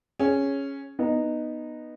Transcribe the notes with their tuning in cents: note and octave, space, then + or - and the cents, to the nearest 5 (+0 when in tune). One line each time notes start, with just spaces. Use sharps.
C#4 -5 G#4 +0
B3 -10 D#4 -15